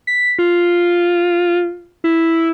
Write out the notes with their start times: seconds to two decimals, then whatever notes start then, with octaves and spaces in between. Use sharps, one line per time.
0.07 B6
0.39 F4
2.04 E4